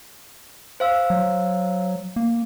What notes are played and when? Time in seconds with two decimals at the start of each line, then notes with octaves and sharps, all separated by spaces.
0.80 C5 F5 E6
1.10 F#3
2.16 A#3